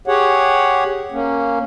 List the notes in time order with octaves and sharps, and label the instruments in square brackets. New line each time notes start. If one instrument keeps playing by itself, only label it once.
[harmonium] G4 G#4 C#5 F#5
A#3 C#4